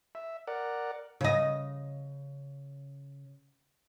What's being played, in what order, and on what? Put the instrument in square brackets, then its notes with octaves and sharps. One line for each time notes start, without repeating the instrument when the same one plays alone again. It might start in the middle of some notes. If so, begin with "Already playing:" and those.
[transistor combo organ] E5
A#4 D5 F#5
[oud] C#3 D#5